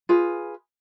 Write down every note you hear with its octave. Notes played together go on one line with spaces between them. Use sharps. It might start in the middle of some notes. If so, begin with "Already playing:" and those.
F4 G#4 B4